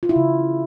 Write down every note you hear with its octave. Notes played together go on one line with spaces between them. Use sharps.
F4
E4
C#3